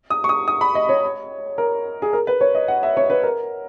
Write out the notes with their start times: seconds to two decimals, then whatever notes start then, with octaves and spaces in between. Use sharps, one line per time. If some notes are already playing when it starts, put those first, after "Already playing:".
0.10 D#6
0.24 C#6
0.29 D#6
0.48 D#6
0.61 B5
0.75 D#5
0.89 C#5
1.58 A#4
2.02 G#4
2.13 A#4
2.27 B4
2.41 C#5
2.55 D#5
2.68 F#5
2.83 E5
2.97 C#5
3.10 B4
3.23 A#4